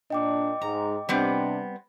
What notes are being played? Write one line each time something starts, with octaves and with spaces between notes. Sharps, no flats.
A#2 D4 D#5 G5 D6
G#2 A#5
C3 G3 B3 C4 D4